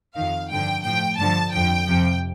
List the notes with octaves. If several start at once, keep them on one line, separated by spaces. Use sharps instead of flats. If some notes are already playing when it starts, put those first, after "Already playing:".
F2 D#3 F5
G2 D3 F3 G5
A2 F3 G5
G2 D3 F3 A5
F2 D3 F3 G5
F2 C3 F3